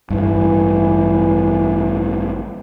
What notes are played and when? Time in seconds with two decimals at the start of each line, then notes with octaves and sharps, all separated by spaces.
0.10 A1 G2 E3